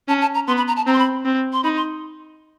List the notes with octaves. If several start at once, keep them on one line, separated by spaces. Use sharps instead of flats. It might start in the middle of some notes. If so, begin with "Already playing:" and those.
C#4 A5
A5
A#5
B3 C6
B5
A#5
A5
C4 A#5
C6
B5
C4
C6
D#4 B5
C6